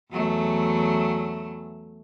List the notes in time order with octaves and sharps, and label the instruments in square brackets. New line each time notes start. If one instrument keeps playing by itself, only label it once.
[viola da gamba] E2 F#3 A3